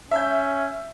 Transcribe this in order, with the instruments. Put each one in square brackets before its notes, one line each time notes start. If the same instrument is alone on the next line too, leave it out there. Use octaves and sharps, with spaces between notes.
[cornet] C#4 [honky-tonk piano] E5 G6